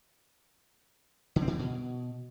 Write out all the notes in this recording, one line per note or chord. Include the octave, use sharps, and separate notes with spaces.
D3
C4
D3
E3
B2